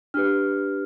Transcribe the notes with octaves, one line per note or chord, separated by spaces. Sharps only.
D4 G4 B4 F6